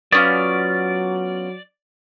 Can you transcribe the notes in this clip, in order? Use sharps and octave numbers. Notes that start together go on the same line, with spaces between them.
F#3 B3 C#4 F4 D5